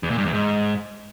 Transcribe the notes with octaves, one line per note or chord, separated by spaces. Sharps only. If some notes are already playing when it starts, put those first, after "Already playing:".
E2
A#2
G2
E2
G#2